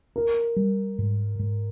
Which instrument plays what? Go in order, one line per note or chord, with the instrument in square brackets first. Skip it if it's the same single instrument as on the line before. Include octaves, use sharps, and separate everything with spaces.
[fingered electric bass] D4 [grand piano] A#4
[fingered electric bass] G3
G#2
G#2